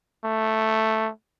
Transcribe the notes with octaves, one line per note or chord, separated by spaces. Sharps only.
A3